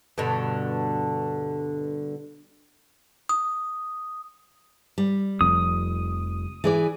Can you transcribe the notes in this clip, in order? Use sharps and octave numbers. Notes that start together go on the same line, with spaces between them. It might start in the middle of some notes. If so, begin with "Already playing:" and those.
G2 B2 D3
D#6
G3
F1 F2 D#6
E3 G#4 D5